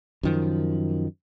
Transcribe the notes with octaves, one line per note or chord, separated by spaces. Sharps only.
F#2 D#3 F3